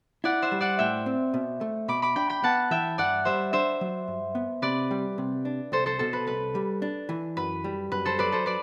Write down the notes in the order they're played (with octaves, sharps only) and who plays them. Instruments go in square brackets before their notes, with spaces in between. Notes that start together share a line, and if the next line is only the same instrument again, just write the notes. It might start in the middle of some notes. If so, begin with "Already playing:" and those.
[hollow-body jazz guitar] E4 [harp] D5 F#5
[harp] C5 E5
[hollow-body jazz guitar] G3
[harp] D5 F#5
[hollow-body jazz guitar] A2 [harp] E5 G5
[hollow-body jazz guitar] C4
B2
A3
[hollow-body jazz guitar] B2 [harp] B5 D6
[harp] B5 D6
[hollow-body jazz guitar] D4 [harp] G5 B5
[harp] G5 B5
[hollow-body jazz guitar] B3 [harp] F#5 A5
[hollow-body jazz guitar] E3 [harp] E5 G5
[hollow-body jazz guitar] G2 [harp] D5 F#5
[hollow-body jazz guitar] G3 [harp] C5 E5
[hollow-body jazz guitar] D4 [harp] C5 E5
[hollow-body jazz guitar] F#3
G2
B3
[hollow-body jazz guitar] C3 [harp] B4 D5
[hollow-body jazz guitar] G3
C3
D4
[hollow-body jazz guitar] C2 [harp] A4 C5
[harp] A4 C5
[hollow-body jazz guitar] B2 [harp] A4
[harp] B4
[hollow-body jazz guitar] C2 [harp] B4
[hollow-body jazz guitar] G3
D4
E3
[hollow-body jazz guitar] F#2 [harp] B4
[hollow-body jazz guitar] G3
[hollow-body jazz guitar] F#2 [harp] B4
[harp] A4 C5
[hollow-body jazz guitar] F#3 [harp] B4 D5
[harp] A4 C5
B4 D5